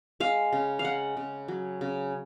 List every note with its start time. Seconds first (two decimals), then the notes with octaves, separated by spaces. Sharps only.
0.20 G#3 F5
0.53 C#3
0.79 F5
0.85 G#3 F#5
1.17 C#3
1.48 F#3
1.81 C#3